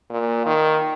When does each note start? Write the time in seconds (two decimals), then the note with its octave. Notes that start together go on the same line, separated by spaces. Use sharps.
0.10 A#2
0.46 D#3